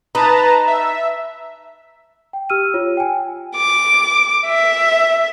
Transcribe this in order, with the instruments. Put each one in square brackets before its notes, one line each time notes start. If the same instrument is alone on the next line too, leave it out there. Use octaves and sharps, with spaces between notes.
[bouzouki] D#4 [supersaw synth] B4 A5 A#5
[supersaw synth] E5
[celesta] G5
G4 E6 F6 D#7
F4 C#5
G5 G#5
[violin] D6
E5